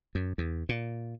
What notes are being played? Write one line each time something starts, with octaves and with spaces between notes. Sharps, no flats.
F#2
E2
A#2